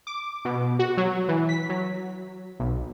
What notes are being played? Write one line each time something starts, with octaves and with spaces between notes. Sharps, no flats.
D6
B2
F#4
F#3
E3
B6
F#3
B1